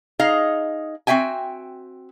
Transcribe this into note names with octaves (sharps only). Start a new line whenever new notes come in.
D#4 G#4 D#5 F5
C4 F#4 E5 G5 G#5